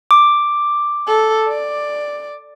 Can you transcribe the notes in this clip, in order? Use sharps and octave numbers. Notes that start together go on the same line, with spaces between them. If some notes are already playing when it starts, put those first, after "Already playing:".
D6
A4
D5